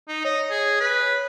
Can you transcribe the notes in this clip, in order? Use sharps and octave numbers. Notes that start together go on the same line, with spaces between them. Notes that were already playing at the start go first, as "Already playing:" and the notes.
D#4
C#5 D#5
G#4
B4